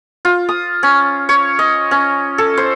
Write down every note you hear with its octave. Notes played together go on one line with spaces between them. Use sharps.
F4
D#6
C#4
C#5
D#5
C#4
A4
C5